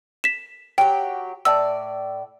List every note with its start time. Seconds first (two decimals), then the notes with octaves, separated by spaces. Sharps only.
0.24 B6 E7
0.78 F#3 G4 G5
1.45 A2 D5 A5 E6